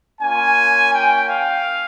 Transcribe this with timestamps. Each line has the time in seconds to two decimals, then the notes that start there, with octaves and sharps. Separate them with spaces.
0.20 A#3 C#4 F4 G#5
0.93 G5
1.28 F5